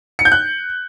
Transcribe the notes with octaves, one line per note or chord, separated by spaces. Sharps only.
C#7
G6
F#6